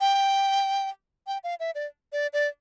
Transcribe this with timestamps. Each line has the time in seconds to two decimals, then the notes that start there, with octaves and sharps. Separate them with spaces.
0.01 G5
1.27 G5
1.44 F5
1.60 E5
1.75 D5
2.13 D5
2.33 D5